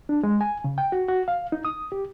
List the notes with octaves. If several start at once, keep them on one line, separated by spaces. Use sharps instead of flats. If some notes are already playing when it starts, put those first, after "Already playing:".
D4
G#3
G#5
C#3
G5
F#4
F#4
F5
D#4
D#6
G4